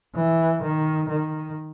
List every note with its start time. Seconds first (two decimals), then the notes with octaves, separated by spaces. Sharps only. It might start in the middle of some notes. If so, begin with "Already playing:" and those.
0.16 E3
0.63 D#3
1.09 D#3